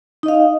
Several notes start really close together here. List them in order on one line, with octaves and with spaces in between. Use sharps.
D#4 D#5 F5